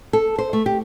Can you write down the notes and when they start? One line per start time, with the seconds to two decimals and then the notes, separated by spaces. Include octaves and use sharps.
0.13 A4
0.38 C5
0.53 A3
0.66 G4